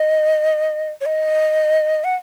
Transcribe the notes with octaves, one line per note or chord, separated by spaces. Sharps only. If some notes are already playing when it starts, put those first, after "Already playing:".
Already playing: D#5
C#5
D#5
F#5